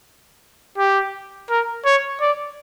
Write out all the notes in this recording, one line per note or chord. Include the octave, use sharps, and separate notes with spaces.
G4
A#4
C#5
D5